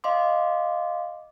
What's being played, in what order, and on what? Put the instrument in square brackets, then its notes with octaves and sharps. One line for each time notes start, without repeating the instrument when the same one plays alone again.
[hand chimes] D#5 F5 C6 D6